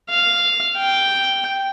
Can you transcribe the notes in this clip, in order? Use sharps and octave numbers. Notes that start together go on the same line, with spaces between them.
F5
G5